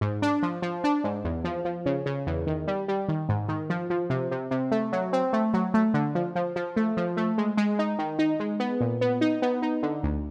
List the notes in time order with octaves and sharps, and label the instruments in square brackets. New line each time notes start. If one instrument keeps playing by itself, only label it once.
[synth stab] G#2
D4
F3
F3
D4
G#2
E2
F3
F3
C#3
C#3
E2
D#3
G3
G3
D#3
G#2
D#3
F3
F3
C3
C3
C3
A3
F#3
C4
A3
F#3
A3
D3
F3
F3
F3
A3
F3
A3
G#3
G#3
D#4
D#3
D#4
G#3
B3
A#2
B3
D#4
B3
D#4
D3
D2